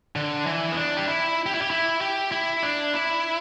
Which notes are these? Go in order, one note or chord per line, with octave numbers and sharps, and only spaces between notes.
D3
E3
B3
D4
G4
E4
G4
E4
G4
E4
G4
E4
D4
E4